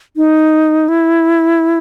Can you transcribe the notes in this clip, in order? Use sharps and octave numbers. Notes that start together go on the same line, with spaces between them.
D#4
E4